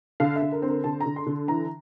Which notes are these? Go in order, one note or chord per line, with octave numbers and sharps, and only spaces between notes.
D3 F5
E5
D3
A#4
C4
A#4
D3 A5
A#5
D3
C6
D3
E3 A#5